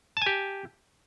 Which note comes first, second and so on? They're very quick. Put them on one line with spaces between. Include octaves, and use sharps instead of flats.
A5 G#5 G4